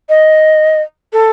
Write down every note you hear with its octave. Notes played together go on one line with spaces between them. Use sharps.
D#5
A4